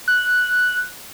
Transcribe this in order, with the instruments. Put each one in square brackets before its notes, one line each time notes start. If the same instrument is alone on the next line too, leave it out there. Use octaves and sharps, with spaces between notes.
[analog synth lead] F#6